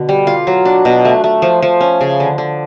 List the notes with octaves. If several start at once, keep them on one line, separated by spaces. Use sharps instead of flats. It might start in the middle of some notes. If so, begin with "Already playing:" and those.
Already playing: B2 D3
G3
F4
F#3
D4
B2
A3
A3
F3
F3
C#4
C#3
D3
D3